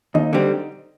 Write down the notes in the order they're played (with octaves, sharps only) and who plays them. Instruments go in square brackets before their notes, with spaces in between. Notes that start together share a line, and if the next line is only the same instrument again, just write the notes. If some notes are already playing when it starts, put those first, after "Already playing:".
[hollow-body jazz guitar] D#2 [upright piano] D#4 D#5
[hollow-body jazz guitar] D3 G3 C4